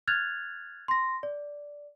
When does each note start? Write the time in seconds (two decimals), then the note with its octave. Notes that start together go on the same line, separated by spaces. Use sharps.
0.08 F6 F#6 G#6 A6 F7
0.88 C6 A#6
1.23 D5